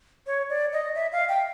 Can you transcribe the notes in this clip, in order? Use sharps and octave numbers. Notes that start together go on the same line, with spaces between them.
C#5
D5
D#5
E5
F5
G5